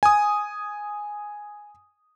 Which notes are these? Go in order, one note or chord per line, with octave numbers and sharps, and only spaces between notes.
G#5 D#6